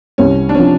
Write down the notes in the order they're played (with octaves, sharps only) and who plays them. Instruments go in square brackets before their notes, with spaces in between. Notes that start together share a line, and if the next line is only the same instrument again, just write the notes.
[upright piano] C2 [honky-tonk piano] C#4
[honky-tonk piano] D4
[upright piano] C3 F3 [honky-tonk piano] C#4